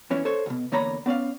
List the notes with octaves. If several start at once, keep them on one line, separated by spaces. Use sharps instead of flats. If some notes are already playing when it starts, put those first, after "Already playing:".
E2 E3 C#4 E4
A4 C5 C#5
D2 B2
E2 D3 A#3 C#5 A#5 B5
B3 C#4 D5 F5